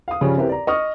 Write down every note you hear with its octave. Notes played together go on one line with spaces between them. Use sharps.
F5 D#6
G2 C#3 F3 G3 C#4
C4 E4 G4 A#4 B4
D5 A#5
D#5 C#6 D#6 F6